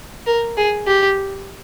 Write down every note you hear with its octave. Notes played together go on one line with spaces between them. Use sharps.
A#4
G#4
G4